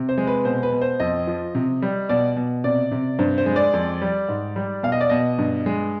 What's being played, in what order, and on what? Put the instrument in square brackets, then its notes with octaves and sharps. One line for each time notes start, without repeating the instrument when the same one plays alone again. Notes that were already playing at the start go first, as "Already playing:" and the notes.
Already playing: [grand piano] C3
C5
G#3
B4
B2 C5
B4
B2
C5
F2 D#5
F3
C3
G3
B2 D5
B2
C3 D5
C3
G2 C5
C5
G#3
D5
F2
G3
G#2
G3
B2 F5
D#5
D5
B2 D#5
G2
G#3